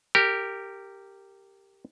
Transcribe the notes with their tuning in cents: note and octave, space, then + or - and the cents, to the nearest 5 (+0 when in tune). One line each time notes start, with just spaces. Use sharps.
G4 +0 A#4 -20